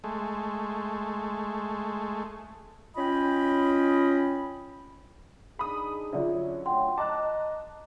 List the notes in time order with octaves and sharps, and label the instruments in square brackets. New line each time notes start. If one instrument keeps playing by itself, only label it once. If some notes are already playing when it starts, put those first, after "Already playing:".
[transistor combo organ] G#3 A3
[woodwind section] C#4 F4 D#5 G5 B5
[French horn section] D4 D#4 G#4 [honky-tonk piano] B5 D#6
[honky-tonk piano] D3 F#3 C#4 [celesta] F4 D5 E5
[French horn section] A3 F4 [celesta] F#5 G5 C6
[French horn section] D#5 [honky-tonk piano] A5 A#5 F#6 [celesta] D6